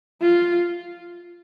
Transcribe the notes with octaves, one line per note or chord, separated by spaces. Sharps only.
F4